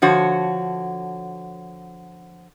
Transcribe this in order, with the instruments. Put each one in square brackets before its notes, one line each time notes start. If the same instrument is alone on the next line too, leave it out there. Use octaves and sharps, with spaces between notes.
[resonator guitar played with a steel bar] D3 F3 F#4 C#5